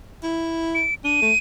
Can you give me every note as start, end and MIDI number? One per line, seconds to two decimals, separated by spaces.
0.23 0.85 64
0.75 0.94 98
1.04 1.22 62
1.04 1.38 99
1.22 1.33 57